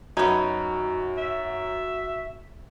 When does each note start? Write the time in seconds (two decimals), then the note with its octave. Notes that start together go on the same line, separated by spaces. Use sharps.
0.17 F#2 B3 D#4 F#4 G#6
1.17 E5